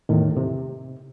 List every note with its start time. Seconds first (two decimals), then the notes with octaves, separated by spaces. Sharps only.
0.09 E2 A2 D#3
0.37 C3